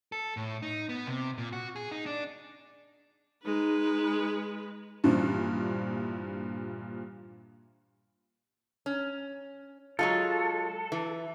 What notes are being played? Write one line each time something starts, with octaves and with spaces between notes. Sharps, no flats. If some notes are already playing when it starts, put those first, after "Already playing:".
A4
A2
D#4
B3
C3
A#2
F#4
G#4
D#4
D4
G#3 D#4 B4
G2 A#2 E3 F3 D4
C#4
F#3 G#3 F4 A4
E3